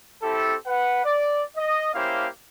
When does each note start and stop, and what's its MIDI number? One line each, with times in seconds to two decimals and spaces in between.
0.23 0.56 60
0.23 0.56 64
0.23 0.56 67
0.23 0.56 69
0.66 1.03 71
0.66 1.03 78
1.05 1.43 74
1.57 1.91 75
1.95 2.28 58
1.95 2.28 61
1.95 2.28 64
1.95 2.28 67
1.95 2.28 72
1.95 2.28 77